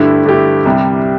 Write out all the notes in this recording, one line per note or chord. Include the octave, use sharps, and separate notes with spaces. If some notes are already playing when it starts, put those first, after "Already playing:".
Already playing: G2 D3 A3 E4 G4
G2 D3 A3 E4 G4
C2 C3 G3